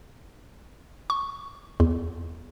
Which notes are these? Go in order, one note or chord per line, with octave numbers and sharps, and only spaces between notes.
C#6
E2